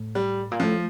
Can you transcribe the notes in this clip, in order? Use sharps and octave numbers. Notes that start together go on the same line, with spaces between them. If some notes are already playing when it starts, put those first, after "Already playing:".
Already playing: A2
G3
A#2
A2 F3